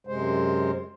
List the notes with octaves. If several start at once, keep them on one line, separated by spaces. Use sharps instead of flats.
F#2 C3 G#3 C5